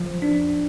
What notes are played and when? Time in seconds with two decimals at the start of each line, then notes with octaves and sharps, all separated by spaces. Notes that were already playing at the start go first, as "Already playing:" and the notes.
Already playing: F3
0.22 D4